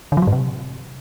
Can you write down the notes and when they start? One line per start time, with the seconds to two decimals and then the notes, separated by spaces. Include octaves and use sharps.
0.12 D3
0.17 F3
0.22 F#3
0.27 G#2
0.32 C3